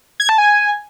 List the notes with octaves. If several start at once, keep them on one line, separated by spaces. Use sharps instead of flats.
G#6
A5
G#5